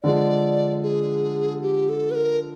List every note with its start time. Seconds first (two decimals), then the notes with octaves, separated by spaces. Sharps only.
0.03 D3 F3 G#3 D5
0.83 G#4
1.62 G4
1.89 A4
2.11 B4
2.15 A#4